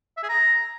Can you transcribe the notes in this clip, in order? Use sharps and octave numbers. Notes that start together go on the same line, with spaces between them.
E5
G#4
A#5